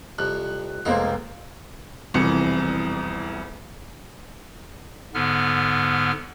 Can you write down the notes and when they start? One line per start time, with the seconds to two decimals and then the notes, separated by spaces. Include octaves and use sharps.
0.19 C2 F2 F#6
0.85 F1 G#3 A#3 D#4 C5
2.14 E1 C2 F2 E3 C#7
5.14 G#2 D3 B3 F6